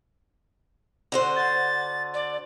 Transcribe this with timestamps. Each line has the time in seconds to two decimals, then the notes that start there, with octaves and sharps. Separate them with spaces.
1.12 D3 F#4 C5
1.36 A6
2.14 D5